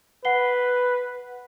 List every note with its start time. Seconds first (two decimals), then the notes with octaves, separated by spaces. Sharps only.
0.25 B4 F#5 C7 G7